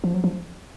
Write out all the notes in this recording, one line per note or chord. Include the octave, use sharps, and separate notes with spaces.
F3
F#3
F3